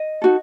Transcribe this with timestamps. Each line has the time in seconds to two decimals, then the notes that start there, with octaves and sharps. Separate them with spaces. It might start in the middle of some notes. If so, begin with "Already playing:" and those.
Already playing: D#5
0.22 D#4 F#4 A4